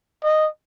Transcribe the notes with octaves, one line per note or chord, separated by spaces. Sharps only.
D#5